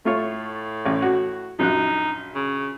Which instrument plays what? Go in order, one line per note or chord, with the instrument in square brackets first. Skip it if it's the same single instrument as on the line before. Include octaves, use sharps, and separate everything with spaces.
[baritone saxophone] A2 [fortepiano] A3 F4 C#5
[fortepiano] A1
F#4
[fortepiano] A#1 F#2 F#6 [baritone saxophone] D#4
[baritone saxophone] C#3